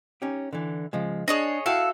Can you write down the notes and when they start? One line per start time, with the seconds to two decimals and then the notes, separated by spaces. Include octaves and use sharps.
0.22 C#4 D#4 G4
0.53 D3 E3
0.93 C#3 F3 G#3
1.28 D4 G#4 C#5 D#5
1.66 E4 F#4 A4 F5 G5 F#6